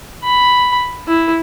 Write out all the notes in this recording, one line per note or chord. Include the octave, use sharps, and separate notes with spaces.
B5
E4